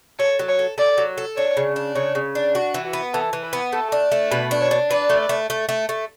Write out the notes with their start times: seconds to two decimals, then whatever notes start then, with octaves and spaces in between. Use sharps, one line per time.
0.19 A4 C#5
0.39 F#3
0.48 C#5
0.59 A4
0.78 A4 D5
0.98 F#3
1.18 A4
1.37 D4 C#5
1.57 C#3
1.76 D4
1.95 C#3 C#5
2.15 C#3
2.35 D4
2.55 F#4
2.74 E3
2.85 F#4
2.93 B3
3.13 E3 A4
3.33 E3
3.43 B4
3.53 B3
3.73 A3 A4
3.92 D4
4.12 A3
4.31 B2 B4
4.51 D4
4.61 C#5
4.71 D4
4.90 B4 D5
5.10 A3
5.29 A3
5.50 A3
5.69 A3
5.89 A3